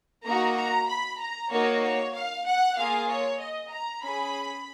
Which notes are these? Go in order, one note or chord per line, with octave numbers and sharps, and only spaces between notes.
A#3 D#4 F#4 A#5
A#5
B5
A#5
A#3 D#4 F#4 C#5
C#5
F5
F#5
A#3 F4 G#4 F5
C#5
D#5
A#5
C#4 G#4 B5